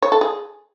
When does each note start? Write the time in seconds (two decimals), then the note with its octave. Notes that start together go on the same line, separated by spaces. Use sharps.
0.02 C#5
0.12 A4
0.21 G#4